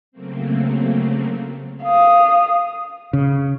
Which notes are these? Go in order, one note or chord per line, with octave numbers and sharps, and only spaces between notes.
C#3 F#3 A3 A#3 C4
F5 D#6
C#3